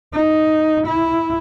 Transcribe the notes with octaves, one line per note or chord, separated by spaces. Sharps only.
D#4
E4